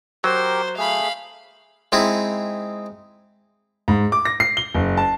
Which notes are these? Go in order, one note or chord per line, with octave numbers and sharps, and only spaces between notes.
F#3 G4 A#4 C5
A3 G#4 F5 B5
G#3 C4 D#4 E4
G#2
D6
A#6
C7
G7
F#1
A5